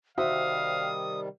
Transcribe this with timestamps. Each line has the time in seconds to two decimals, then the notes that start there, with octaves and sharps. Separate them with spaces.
0.18 C3 D#3 G3 F#4 C5 E5 F5 D#6